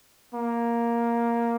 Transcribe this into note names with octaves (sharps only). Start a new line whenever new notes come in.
A#3